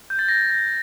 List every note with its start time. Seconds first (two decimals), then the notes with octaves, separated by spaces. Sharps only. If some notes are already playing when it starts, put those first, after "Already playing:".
0.10 G6
0.19 A6
0.29 A#6
0.50 A#6